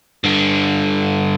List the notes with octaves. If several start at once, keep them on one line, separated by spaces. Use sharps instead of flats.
G2 D3